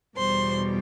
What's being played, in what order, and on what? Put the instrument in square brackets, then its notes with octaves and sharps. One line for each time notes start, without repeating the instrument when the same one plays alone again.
[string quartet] E2 B2 G3 C5 C6